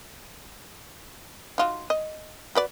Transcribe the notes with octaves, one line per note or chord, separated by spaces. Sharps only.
D#4 F4 F#4
D#5
F#4 B4 D5